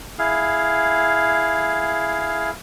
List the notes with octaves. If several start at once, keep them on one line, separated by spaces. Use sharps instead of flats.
E4 G#4 F5